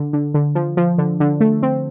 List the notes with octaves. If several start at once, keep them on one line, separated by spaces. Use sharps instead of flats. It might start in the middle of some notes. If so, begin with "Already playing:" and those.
Already playing: D3
D3
D3
F3
F3
D3
D3
A3
C4